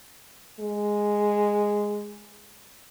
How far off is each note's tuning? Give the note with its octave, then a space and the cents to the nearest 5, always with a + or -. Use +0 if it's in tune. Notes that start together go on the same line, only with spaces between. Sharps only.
G#3 -5